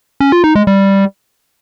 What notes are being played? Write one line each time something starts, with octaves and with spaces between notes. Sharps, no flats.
C#4
F4
D#4
G#3
G3